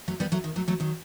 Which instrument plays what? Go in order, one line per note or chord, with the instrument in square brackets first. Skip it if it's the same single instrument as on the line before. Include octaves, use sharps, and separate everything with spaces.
[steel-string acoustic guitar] F#3 A3
G3 B3
F#3 A3
D#3
F#3 A3
F#3 A3
D#3 F#3